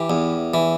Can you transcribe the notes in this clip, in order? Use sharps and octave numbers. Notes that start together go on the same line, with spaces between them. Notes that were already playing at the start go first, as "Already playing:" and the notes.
Already playing: E3 G4
E2
E3